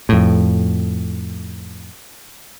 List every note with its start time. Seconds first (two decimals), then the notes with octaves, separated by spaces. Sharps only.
0.09 F2 A2